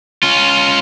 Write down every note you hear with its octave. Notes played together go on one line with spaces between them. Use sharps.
C#4 F4